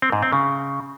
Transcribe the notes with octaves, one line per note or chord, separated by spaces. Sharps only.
C4
G#2
C4
C#3